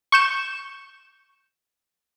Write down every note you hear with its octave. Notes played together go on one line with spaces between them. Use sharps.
C#6 G6 E7